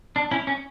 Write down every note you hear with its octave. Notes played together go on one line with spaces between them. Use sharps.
D4
C#4 E4
C#4